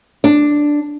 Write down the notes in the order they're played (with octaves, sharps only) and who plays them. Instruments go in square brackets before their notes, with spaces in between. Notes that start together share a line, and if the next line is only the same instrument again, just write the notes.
[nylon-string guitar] D4